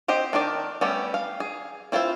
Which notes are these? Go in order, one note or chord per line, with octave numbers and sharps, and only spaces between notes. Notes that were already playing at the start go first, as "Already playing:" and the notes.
C4 G4 C5 D#5
D#3 D4 A#4 D5
G3 A3 B3 C#4 G4
F5
G#4
C4 E4 F4 A#4 C5